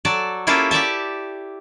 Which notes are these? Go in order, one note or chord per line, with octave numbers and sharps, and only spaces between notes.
F#3 A4 D5
A#3 C#4 E4 F4 G4 A4
G4 D5 E5 A5